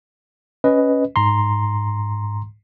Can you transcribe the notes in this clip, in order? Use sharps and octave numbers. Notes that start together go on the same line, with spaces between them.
C#4 B4 D#5
G#2 A#5 C6